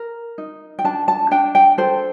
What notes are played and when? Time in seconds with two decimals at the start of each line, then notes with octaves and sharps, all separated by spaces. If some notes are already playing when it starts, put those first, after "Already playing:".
Already playing: A#4
0.38 D#4
0.79 G5
0.84 D4 A5
1.08 A5
1.31 D4 G5
1.55 G5
1.78 A4 C5